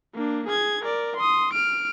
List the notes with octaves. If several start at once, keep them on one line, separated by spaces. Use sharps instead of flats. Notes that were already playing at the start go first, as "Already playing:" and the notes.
A#3 D4
G#4 G#6
A#4 D5
C6 D#6
F6 D7